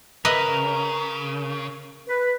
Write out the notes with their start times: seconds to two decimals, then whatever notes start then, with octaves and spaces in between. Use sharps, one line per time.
0.25 C#3 A#4 B4 D#5 E5
2.08 B4